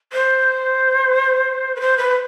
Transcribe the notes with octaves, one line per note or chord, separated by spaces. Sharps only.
C5
B4
C5
B4